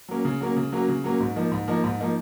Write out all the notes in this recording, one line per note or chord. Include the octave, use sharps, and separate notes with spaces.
F#3 A#3 C#4
C#3
F#3 A#3 C#4
C#3
F#3 A#3 C#4
C#3
F#3 A#3 C#4
G#2
F3 A#3 D#4
G#2
F3 A#3 D#4
G#2
F3 A#3 D#4